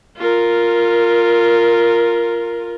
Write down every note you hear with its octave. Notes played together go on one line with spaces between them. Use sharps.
F4 A#4